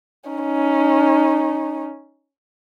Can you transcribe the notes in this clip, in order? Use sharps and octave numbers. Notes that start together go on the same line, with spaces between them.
C#4 D#4